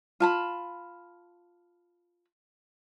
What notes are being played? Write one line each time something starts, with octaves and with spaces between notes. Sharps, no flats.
F4 A5 B5